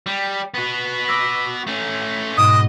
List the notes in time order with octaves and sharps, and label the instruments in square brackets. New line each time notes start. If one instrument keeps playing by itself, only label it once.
[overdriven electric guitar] G3
B3 F#4
[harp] D6 E6 A#6
[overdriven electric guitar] A3 C#4
[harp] G#2 B2 [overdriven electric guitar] D#5 [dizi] D#6